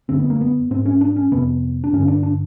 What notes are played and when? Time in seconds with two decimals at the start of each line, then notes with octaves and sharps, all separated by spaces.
0.09 F#2 D3 C4
0.19 B3
0.30 A#3
0.41 B3
0.71 G#2 C4
0.86 C#4
1.01 D4
1.16 C#4
1.32 F2 C3 B3
1.84 D4
1.93 G2 D3 C#4
2.08 D4
2.23 D4